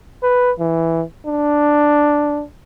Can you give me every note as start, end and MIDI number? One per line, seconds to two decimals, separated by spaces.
0.23 0.52 71
0.60 1.02 52
1.26 2.43 62